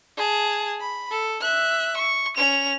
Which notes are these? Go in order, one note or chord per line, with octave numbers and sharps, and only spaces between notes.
G#4 A5
B5
A4
E5 F#6
C#6
C#4 F7